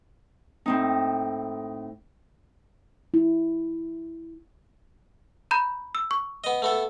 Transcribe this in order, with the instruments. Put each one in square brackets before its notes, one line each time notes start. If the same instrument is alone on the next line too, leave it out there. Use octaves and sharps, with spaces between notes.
[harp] A2 C4 D#4
[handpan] E4
[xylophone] A#5 B5 G6
E6
C#6
[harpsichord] B3 D#5
A3 B3 A4